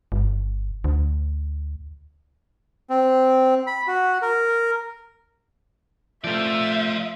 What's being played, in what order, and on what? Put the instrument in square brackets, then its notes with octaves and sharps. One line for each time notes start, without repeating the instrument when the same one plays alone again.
[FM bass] G1
D2
[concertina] C4
B5
F#4
A#4
[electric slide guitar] F3 A3 [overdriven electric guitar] F4 D5 [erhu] E5